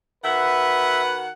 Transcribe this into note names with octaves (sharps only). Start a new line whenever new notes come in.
D#3 F#4 B4 E5 F#5